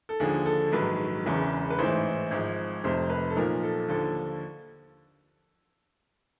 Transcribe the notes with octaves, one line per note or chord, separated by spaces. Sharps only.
A4
D#2 D3 F3 G#4
A4
A#1 G#2 D#3 F#3 B4
E1 E2 C#3 E3
B4
A1 G#2 E3 C5
G#1 G#2 F3
F1 F2 C3 C5
B4
A4
B1 A#2 F3 A#4
A4
D#2 D3 F3 A4